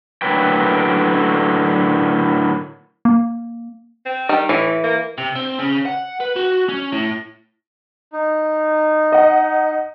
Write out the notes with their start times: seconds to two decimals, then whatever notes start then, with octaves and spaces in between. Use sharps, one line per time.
0.22 A2 D3 F#3 A#3 B4 G5
3.05 A#3
4.06 C4
4.29 D#3 G3
4.49 A2 E3
4.84 A#3
5.18 C3
5.35 C4
5.59 C#3
5.85 F#5
6.20 B4
6.36 F#4
6.69 C#4
6.92 A2
8.13 D#4
9.12 D#5 F#5